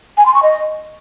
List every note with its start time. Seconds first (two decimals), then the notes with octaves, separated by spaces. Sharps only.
0.18 G#5
0.26 C6
0.34 C#6
0.43 D#5